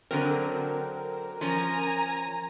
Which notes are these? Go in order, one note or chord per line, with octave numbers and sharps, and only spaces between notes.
D3 F#3 C4 A#4
F3 C#4 G#5 A#5